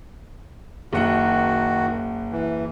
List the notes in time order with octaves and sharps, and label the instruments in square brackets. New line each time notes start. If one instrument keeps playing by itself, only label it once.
[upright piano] F#1 F#5 [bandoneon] D#3 F#4
[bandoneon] E3